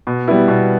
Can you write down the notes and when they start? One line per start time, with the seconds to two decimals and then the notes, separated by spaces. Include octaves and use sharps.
0.07 B2
0.28 G3 B3 E4
0.48 B2